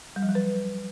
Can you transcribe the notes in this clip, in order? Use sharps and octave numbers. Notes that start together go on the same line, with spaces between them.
G3
F3
F#3
B4